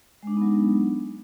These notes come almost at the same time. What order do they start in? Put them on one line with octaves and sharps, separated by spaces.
G#3 D4 D#4 B3 F#3